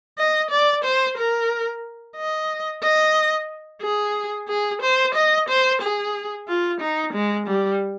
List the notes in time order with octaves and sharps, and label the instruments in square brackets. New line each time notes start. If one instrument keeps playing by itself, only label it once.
[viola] D#5
D5
C5
A#4
D#5
D#5
G#4
G#4
C5
D#5
C5
G#4
F4
D#4
G#3
G3